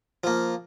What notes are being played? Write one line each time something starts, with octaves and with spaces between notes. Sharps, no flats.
F3 A#3